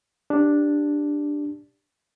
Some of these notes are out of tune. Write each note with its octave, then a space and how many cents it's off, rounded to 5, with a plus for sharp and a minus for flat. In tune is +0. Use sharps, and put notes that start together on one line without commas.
D4 +0 G4 +10